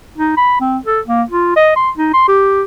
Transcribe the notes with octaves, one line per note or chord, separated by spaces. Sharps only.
D#4
B5
C4
A4
A#3
F4
D#5
C6
D#4
C6
G4